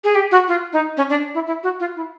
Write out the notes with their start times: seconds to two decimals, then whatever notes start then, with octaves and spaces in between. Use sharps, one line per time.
0.04 G#4
0.15 G4
0.32 F#4
0.48 F4
0.73 D#4
0.97 C#4
1.10 D4
1.34 E4
1.47 E4
1.63 F#4
1.80 F4
1.96 E4